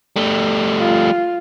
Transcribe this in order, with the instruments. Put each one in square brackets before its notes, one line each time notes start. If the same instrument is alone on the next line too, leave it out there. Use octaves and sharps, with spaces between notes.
[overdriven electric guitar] G3 A3
[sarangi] F4